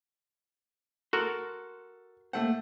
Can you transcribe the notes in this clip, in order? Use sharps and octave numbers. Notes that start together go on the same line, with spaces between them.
F#4 A4 A#4 C6
A3 A#3 A4 C5 F#5